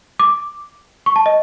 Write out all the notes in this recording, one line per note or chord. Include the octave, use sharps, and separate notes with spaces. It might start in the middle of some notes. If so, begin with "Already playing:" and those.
D6
C#6
A5
D#5